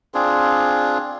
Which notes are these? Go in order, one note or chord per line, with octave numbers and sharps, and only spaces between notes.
C4 D4 F4 G#4